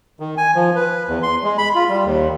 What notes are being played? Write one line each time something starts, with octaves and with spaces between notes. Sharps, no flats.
D#3
G#5
F3
B4
E2
C6
G#3
B5
F4
G3
D#2